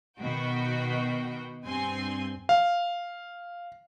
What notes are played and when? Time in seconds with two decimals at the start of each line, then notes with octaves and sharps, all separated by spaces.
0.20 B2 D#3 F#4 G5
1.64 G2 C4 G#5 C6
2.49 F5